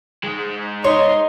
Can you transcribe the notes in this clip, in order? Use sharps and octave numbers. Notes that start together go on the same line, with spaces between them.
G#2 G#3
D#4 C#5 C6